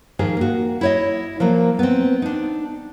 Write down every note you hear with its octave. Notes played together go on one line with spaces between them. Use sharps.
G#2 D#3 F3 G#4
A#3 F#4
E4 C#5 D#5
F3 F#3 A#3
B3 C4
D4 D#4